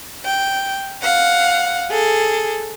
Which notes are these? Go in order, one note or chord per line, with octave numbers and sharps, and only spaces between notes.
G5
F5 F#5
G#4 A4